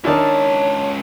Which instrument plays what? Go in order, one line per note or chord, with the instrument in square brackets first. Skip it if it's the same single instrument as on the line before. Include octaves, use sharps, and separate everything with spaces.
[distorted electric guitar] C#2 A5 [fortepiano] D#3 D4 E4 [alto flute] C#5